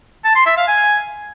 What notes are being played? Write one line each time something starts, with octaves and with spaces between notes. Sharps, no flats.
A5
C6
E5
F5
G#5